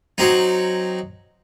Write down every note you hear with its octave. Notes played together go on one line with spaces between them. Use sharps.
F#3 C4 D#4